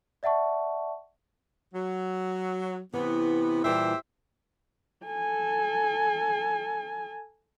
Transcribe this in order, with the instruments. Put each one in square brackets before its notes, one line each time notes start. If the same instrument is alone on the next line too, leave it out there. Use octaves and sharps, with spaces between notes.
[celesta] D5 E5 F#5 A5 C#6
[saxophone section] F#3
[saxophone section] C3 B3 [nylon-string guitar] E3
[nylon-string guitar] A#2 E3 G3 [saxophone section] G4 C5 E5
[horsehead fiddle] A4 G#5